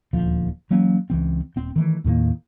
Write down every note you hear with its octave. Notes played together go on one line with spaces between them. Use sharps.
D#1 D2 F3
E3 F#3 A#3 C#4
C#2 E3 C4
D#1 C4
D#3 E3 A3
D#2 A2 D#3 A#3